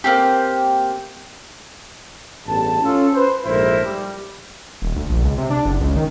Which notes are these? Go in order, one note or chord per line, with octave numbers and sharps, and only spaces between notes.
A#3 C4 G4
A1 E2 G2 A5
C#4 F4 A4
B4 C5
A#1 G#2 A3 E4 A#4 C5
G3
D#1
D2
A#1
C#2
C3
D4
F#1
C#2
D#3